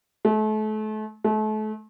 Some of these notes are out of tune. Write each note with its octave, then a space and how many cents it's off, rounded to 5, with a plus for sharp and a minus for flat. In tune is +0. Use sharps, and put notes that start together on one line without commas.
A3 -35
A3 -35